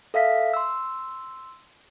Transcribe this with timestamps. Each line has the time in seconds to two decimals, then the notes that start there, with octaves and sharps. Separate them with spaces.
0.14 A4 E5 F5 B6
0.54 C6 E6